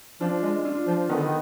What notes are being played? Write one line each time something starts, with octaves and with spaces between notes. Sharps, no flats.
F3 D4 F4
G#3
D4 F4
F3
D#3 B3 D#4
D3
D#3